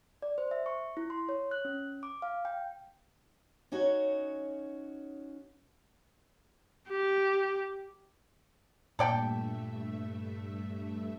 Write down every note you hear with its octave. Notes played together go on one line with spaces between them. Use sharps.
D5
C5
E5
C#6
E4
C6
C#5
F#6
C#4
D6
F5
G5
C#4 D#4 F#4 C#5
G4
G2 A#2 A3 A4 D5 E5 G5